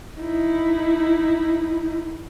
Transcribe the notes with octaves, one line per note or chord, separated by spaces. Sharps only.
D#4 E4